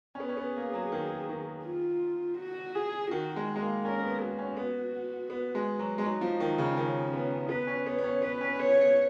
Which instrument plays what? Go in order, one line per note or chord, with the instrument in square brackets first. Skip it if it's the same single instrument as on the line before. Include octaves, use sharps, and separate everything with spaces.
[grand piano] C#4
[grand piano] B3 [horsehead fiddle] G#4
[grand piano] C#4
B3
A#3
F#3
D#3
D#3
[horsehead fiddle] F4
F#4
G#4
[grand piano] D#3 [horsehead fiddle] F#4
[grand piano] G#3
G#3
A#3
[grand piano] C#4 [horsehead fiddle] A#4
[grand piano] B3
[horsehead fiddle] F#4
[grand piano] C#4
B3
B3
G#3
F#3
G#3
[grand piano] F#3 [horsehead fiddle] D#4
[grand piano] F3
D#3
C#3
[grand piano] D#3 [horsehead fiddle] C#4
[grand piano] B3
[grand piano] B3 [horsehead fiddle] B4
[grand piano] C#4
[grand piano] B3 [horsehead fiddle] C#5
[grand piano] B3
C#4
[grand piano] B3 [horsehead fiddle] B4
[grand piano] C#4
[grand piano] B3 [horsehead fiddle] C#5
[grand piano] B3